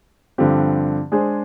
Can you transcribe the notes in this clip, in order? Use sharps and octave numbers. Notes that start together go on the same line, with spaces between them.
G2 D3 F3 C4 G4
G#3 D4 G#4 C5